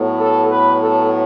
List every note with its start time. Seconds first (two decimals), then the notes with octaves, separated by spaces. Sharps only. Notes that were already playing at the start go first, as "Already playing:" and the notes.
Already playing: A2 F#3 B3
0.19 A4
0.50 B4
0.82 A4